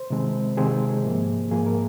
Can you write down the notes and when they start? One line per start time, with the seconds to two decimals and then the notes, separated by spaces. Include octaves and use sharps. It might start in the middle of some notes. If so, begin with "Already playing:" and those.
Already playing: C5
0.10 C3 D#3 G#3 C4
0.57 C3 D#3 G#3 C4 G#4
1.04 G#2 F3 A#3
1.51 G#2 F3 A#3 G#4
1.66 A#4